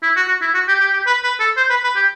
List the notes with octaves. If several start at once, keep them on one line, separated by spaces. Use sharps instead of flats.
E4
F#4
F#4
E4
F#4
G4
G4
G4
B4
B4
A4
C5
B4
B4
G4